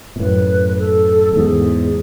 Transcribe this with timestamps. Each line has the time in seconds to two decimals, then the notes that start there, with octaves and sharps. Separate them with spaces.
0.16 B2
0.19 F#2 A2 B4
0.72 B4
0.78 A4
1.32 F#2
1.36 E2 G#2 G#4